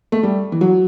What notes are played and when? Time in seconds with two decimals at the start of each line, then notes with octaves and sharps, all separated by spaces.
0.12 A3
0.23 G3
0.52 E3
0.61 F#3